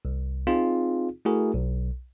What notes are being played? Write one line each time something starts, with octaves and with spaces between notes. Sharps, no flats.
C2
C4 D#4 F4 G#4
A3 E4 F#4 G#4 A#4
B1